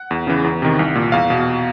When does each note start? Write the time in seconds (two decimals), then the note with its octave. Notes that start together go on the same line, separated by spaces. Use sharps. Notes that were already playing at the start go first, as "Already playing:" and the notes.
Already playing: F#5
0.11 E2
0.27 C#3 E3
0.44 E2
0.62 C3 D#3
0.79 C2
0.95 A#2
1.12 E2 F5
1.30 B2